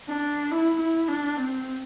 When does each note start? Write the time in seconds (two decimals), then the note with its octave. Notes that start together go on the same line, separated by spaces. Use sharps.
0.09 D4
0.51 E4
0.80 E4
1.08 D4
1.37 C4